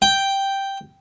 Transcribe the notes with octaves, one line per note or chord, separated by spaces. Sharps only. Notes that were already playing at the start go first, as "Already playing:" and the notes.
G5